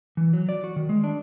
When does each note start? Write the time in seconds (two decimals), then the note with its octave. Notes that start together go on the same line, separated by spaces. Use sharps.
0.17 E3
0.33 F#3
0.49 D5
0.64 F#4
0.76 D#3
0.89 G#3
1.04 D4